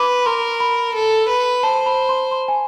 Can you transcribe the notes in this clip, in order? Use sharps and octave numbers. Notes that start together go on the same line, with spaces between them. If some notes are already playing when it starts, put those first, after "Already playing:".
Already playing: B4 D6
A#4 C6
B5
A4
B4
C5 A5
B5
C6
C6
G#5